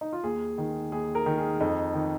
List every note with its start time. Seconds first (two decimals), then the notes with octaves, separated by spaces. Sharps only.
0.01 D#4
0.13 F4
0.23 D#2 G#4
0.58 D#3
0.92 D#2 G#4
1.15 A#4
1.26 D#3
1.38 G#4
1.60 F2 D#4
1.94 D#3